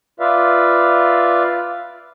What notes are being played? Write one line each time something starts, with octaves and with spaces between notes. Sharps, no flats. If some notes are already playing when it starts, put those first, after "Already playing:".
F4 B4 D5 E5 F5